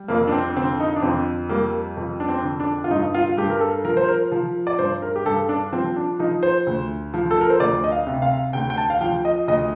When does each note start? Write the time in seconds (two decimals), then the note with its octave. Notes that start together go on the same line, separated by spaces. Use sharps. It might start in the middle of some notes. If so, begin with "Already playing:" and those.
Already playing: G3
0.08 F2 A#3
0.28 D4
0.32 C4
0.56 D3 C4
0.80 D#4
0.96 D4
1.02 F2 C4
1.49 G3 A#3
1.97 F2
2.20 D4
2.29 C4
2.44 D3
2.60 D4
2.84 F4
2.90 G2 D#4
3.14 F4
3.37 G2 G4
3.50 A#4
3.60 A4
3.84 F3 A#4
3.97 C5
4.09 A#4
4.32 F3
4.67 D5
4.79 G2 C5
5.02 A#4
5.16 G4
5.25 G2 A4
5.49 D4
5.72 F3 C4
5.96 D4
6.19 F3 D#4
6.43 C5
6.67 D2
7.14 F3
7.31 A4
7.41 A#4
7.50 C5
7.60 D2 D5
7.84 D#5
7.92 F5
8.07 C3
8.22 F5
8.53 D2 G5
8.70 G5
8.77 A5
8.90 F5
9.01 F3 G5
9.25 D#5
9.48 D2 D#5